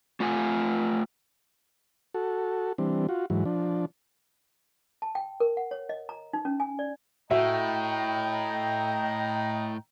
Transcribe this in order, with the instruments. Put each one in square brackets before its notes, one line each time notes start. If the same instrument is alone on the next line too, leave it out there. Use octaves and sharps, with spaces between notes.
[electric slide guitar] A3 F4 F#5 G#5
[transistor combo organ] F#4 A4
E3 G3 C4 D4
F4 F#4
G#2 E3 F#3
F3 D4
[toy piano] A5
G5
A#4
F#5
C#5
D#5
A#5
D#4
C#4
G#5
D5
[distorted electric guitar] A2 [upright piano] F#4 E5 [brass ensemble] D#5 G5 A#5